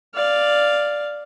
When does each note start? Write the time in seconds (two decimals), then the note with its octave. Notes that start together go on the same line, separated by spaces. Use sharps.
0.15 D5 F5